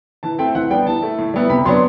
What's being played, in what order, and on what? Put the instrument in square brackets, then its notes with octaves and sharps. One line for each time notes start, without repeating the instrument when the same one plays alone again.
[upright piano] E3 A5
A3 C4 E4 G5
E3 F#5
G3 B3 D4 G5
E3 A5
A3 E4
A2
G3 B3 E4
C3 B5
F#3 B3 D4 C6